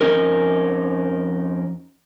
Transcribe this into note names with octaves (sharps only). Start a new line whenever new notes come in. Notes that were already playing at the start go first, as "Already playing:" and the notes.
F2 C#3 C#4 D#4 A#4